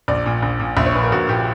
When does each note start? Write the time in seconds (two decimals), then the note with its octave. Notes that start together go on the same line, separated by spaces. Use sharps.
0.08 A#1 D5
0.26 A#2
0.43 A#1
0.60 A#2
0.77 A#1 E5
0.86 C#5
0.94 A#2 B4
1.03 A#4
1.12 A#1 F#4
1.29 A#2 G4